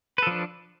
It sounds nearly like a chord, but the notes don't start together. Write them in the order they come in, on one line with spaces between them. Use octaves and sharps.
B4 A4 F3 D4